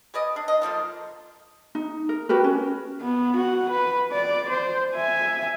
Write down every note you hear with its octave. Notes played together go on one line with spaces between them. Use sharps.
G#4 B4 D5 D#5
D4
D#5
D3 F3 A#3 F4
D#4
A#4
F#4 G4 A#4 B4
C#4
B3
F#4 F#5
B4
D5
C5
E5 G#5